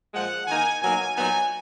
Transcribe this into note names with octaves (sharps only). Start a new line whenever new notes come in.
A#2 F3 G#3 F#5
D#3 A#3 D#4 G#5
B2 F#3 A#3 D#4 G#5
A#2 F#3 B3 D#4 G#5